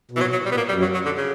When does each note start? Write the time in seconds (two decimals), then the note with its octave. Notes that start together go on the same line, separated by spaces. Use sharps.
0.11 B2
0.16 E3
0.21 A#2 F#3
0.32 F#3
0.37 B2
0.46 G3
0.52 A#2 B3
0.57 A#3
0.69 F#2 G3
0.82 F#3
0.94 F#3
1.05 D3
1.17 C#3